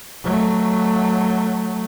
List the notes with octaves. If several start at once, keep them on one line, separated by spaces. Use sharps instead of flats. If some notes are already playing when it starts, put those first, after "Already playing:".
F#3 A3